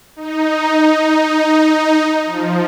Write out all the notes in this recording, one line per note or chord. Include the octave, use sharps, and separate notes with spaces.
D#4
F3